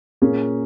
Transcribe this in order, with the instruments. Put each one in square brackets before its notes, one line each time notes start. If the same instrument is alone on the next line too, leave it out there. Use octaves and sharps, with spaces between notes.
[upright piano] A#2 A#3 C#4 G#4